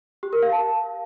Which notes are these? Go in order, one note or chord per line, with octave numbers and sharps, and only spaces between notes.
G4
A#4
F5
A5